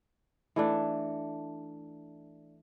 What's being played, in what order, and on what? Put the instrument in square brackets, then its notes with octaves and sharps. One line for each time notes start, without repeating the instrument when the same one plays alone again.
[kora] E3 A3 D4